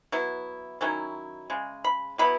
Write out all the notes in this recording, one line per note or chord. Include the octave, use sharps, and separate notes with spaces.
F#3 B3 E4
D#3 F#3 C#4 E4
C#3 G#3
B5
B2 F#3 B3 E4 B5